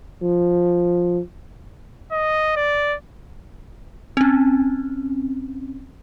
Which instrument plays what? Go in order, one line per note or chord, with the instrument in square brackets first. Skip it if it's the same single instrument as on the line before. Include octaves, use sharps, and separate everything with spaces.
[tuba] F3
[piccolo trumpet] D#5
D5
[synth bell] C4 C#4